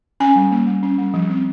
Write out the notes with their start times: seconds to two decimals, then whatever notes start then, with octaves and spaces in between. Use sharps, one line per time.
0.20 C#4 G#5
0.36 G3
0.51 A#3
0.67 G3
0.83 C#4
0.98 G3
1.14 F3
1.30 C4